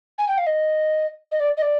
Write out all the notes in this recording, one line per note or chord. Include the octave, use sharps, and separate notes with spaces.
G#5
G5
F5
D#5
D#5
D5
D#5
D5